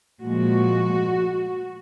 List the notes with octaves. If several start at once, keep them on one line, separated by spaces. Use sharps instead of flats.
A#2 F3 G#3 F#4